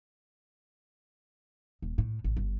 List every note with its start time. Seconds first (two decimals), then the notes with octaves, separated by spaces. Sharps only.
1.82 D#1
1.98 A2
2.24 A1
2.37 G1